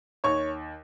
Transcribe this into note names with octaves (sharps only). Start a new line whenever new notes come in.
D#2 C#5 C#6